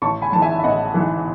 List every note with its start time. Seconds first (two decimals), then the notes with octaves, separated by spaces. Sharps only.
0.02 A1 A5 C#6
0.22 G#5 B5
0.32 G#2 E3 A5
0.42 E5 G#5
0.59 E5
0.64 A1 D#5 F#5
0.94 G#2 E3